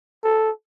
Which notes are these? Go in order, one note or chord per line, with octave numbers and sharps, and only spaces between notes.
A4